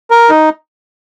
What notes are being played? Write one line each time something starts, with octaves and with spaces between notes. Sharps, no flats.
A#4
D#4